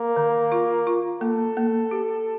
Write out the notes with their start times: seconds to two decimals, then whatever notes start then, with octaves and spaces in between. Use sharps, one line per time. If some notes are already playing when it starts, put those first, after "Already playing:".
Already playing: A#3
0.16 D#3
0.52 F4
0.87 F4
1.21 A#3 A4
1.57 A#3
1.91 G4